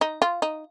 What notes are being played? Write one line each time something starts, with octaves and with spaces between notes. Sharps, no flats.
D#4
F4
D#4